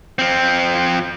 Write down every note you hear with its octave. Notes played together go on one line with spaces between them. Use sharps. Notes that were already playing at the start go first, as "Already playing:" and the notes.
F3 C4